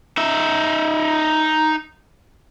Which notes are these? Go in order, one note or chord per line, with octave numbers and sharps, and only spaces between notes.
D#4 E5